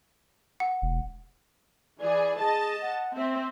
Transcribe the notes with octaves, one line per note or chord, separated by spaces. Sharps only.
F#5
E1
E3 G#4 D5
G#4 D#5 A5
F#5
C4 E5